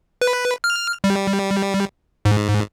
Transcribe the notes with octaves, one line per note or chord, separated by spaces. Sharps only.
B4
F6
G3
G#2